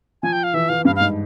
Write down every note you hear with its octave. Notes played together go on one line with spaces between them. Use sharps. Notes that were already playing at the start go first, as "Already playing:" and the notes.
F3 G#5
G5
F5
E3 E5
E3 F5
G2 F5
F5
G#2